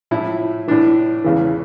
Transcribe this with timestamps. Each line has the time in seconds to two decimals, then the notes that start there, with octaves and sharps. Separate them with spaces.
0.11 A2 F3 E4
0.68 A2 E3 D4
1.24 E2 C#3 E3